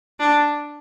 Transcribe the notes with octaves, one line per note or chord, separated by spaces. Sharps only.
D4